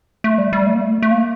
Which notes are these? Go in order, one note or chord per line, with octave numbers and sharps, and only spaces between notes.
A3
G3
G3
A3
A#3
A3
A3
A#3